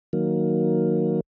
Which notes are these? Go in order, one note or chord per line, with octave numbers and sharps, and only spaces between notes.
D#3 F#3 A#3